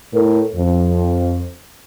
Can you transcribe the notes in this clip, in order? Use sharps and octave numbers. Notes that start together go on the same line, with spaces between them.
A2 A4 A#4
F2